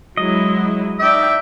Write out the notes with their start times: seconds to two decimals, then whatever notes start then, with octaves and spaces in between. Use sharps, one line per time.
0.17 F#3 G#3 E4 D#5
0.99 D#4 D5 E5 G5